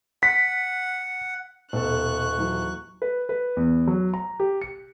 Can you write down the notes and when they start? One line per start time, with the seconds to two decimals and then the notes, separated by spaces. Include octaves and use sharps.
0.23 F#5 B6
1.73 D#1 B2 A4 C#6 F#6
2.38 E3 F#3
3.02 B4
3.29 B4
3.57 E2
3.88 F#3
4.14 A#5
4.40 G4
4.62 C#7